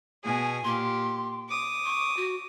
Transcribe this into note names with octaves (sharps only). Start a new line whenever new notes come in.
B2 G#4 G#5
A#2 G4 C6
D6 D#6
C#6
F#4